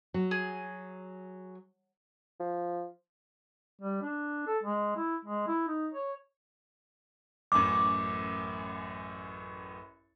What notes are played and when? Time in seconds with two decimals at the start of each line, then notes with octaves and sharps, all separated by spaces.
0.14 F#3
0.31 G#4
2.40 F3
3.81 G3
4.02 D4
4.47 A4
4.63 G#3
4.97 E4
5.25 G#3
5.47 E4
5.68 D#4
5.94 C#5
7.52 A1 F#2 D6